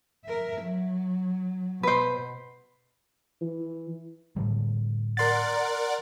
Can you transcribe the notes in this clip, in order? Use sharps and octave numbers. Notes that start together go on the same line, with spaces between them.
A#4 E5
F#3
B2 B4 C5
E3
A2 D3 G3
A#4 D5 F#5 C6 A6